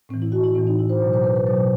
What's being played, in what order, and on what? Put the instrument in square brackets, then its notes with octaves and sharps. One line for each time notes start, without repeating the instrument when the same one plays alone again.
[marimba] A2 C4
E3
E4
F#4
E4
A2 E3 C4
D#4
E4
C5
B2 F#3
C5
B4
B4
B2 F#3 C5